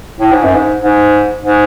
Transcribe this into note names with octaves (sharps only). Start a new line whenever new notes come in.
A2
G#2
F#2
G#2
G#2
G#2